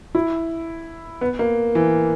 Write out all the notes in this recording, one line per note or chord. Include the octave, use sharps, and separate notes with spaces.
E4
B3
A#3
E3